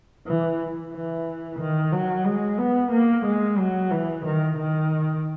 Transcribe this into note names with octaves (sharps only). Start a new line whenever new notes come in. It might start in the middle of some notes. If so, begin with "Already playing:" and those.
E3
E3
D#3
F#3
G#3
B3
A#3
G#3
F#3
E3
D#3
D#3